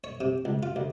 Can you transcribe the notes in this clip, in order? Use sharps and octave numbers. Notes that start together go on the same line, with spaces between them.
C#5
C3
C#2
F4
D2